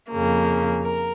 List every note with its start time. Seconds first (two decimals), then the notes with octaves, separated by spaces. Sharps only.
0.11 F2 C#3 A#3
0.84 A#4